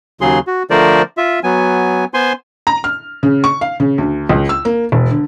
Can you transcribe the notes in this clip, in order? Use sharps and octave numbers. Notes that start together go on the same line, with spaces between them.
D#2 C#3 F#3 G#4 C6
F#4
D3 F3 A3 A#4 C5 D5
F4 E5
F#3 B3 G#5
B3 C5 G#5 C6
A#5
F6
C#3
C#6
F5
C#3
D2
C#2
E6
A#3
E1
D3